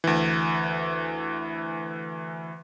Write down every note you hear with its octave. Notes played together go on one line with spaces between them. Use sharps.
D2 E3